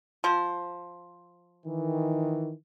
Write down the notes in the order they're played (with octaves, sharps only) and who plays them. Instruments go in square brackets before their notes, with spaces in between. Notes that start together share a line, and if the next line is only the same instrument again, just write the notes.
[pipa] F3 C5
[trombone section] D#3 E3